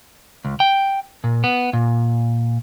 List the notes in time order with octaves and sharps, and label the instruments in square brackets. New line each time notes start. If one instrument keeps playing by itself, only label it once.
[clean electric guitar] C#2
G5
A#2
B3
A#2